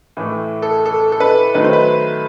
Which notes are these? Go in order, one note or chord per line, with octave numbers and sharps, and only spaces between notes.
A2 E3 A3
A4
A4
A4
B4
D#3 F#3 A3 B4
C5
B4